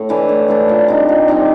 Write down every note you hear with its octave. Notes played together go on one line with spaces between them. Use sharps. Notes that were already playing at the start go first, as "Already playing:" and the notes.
Already playing: A2
E3 A3 D4
A2
E3 A3 D4
A#2
G3 C4 D#4
A#2
G3 C4 D#4